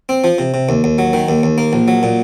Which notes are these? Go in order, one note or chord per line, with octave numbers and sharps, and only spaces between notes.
C4
F3
C3
C3
D#2
D#2
F#3
D#3
D#2
D#2
A#3
A#1
F#3
A#2